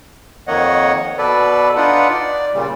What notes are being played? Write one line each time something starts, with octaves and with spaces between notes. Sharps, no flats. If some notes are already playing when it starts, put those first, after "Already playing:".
F2 D#3 A#3 C#5 D#5 F#5
B2 A4 B4 D5
D4 D#4 F4 B4 F#5
D5
A#2 C#3 G3